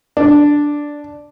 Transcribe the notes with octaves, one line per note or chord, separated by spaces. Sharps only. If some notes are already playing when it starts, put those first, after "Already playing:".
D4